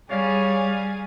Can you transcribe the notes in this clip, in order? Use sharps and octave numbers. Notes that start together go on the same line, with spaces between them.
G3 G#4 C#5 D5 F5 G#5